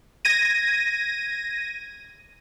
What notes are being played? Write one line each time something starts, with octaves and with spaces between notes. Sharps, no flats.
G#6 A#6 D#7